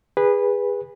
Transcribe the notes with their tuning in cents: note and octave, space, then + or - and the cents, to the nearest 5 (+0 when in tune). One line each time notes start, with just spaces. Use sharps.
G#4 -30 B4 -10